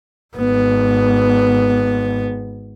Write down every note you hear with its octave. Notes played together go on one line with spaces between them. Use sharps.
G#1 B3